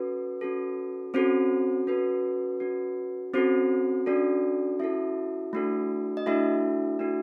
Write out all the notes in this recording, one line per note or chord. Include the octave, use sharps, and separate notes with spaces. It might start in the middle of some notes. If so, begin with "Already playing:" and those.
Already playing: C#4 F#4 A4 B4
C#4 F#4 A4
C4 C#4 F#4 A4 C5
C#4 F#4 A4 B4
C#4 F#4 A4
C4 C#4 F#4 A4 C5
C#4 D4 F#4 A4 D5
C#4 E4 F#4 A4 E5
A3 D4 F#4 A4
D#5
A3 D4 E4 F#4 A4 E5
A3 D4 F#4 A4